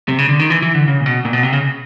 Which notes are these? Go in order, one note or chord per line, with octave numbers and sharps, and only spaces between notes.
C3
C#3
D3
D#3
E3
E3
D3
C#3
A#2
B2
A#2
B2
C3
C#3